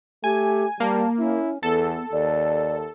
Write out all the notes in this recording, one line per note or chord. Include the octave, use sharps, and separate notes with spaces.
A3 G4 G#5
G3 A#3 A5
C#4 E4
E2 B3 A4
D#2 D5